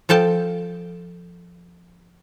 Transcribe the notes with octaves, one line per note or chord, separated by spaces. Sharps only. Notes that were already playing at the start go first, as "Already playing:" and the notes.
F3 A4 G5 A5